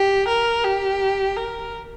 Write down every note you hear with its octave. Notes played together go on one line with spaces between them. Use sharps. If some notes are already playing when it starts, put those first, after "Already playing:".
Already playing: G4
A#4
G4
A#4